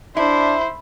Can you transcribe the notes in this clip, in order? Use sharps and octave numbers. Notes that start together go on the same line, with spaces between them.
D4 E4 C5 E5